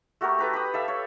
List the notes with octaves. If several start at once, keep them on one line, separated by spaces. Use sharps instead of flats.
A3 F#4 G4 A#4
A4 B4 A#5
G4 B5 D#6
A4 E5 F5
C#5